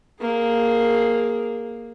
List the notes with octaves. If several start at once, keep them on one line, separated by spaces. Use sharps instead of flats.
A#3 G#4